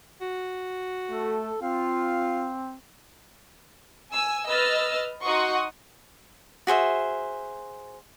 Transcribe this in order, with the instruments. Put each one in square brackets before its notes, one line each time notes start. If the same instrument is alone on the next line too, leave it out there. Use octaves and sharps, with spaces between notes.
[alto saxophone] F#4
[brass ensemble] A3 [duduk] A4
[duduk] C4 [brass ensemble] F4 [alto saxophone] F5
[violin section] G#5 E6
B4 D#5 E6 F6 A6
D#4 F#4 F#5 C6 C#6 D#6
[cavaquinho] F#4 G#4 C5 E5